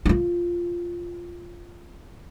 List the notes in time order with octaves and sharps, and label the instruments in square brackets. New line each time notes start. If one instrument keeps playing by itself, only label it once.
[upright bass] E4 F4